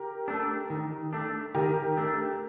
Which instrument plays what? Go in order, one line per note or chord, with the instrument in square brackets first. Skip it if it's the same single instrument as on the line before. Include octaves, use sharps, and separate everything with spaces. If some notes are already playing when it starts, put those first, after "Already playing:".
Already playing: [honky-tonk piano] G4 A#4
[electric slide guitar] A3 D4
D#3
A3 D4
[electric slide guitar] D#3 [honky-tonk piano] G4 A#4
[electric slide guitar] A3 D4